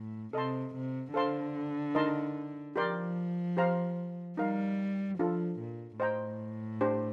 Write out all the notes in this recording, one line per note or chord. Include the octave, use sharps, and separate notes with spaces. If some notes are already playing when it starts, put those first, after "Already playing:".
Already playing: A2
C3 A4 D#5 A5 C6
C3
D3 A4 C5 F5 A5 C6
D#4 A#4 D#5 A5 C6
F3 G4 A#4 D5 G5 C6
G4 C5 F5 A#5
G3 D#4 A#4 F5
F3 D4 F4 A4
A#2
A2 C5 D#5 G5 A#5
D4 G4 C5